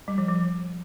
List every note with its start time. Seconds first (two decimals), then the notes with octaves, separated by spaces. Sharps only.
0.08 G3
0.18 F3
0.28 F3